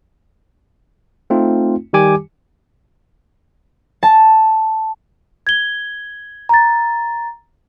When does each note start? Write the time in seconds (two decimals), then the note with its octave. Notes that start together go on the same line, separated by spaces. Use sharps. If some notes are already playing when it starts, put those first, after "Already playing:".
1.30 A3 C4 D#4 F4
1.93 D#3 G3 G4 G#5 D6
4.03 A5
5.47 G#6 G7
6.49 A#5 A6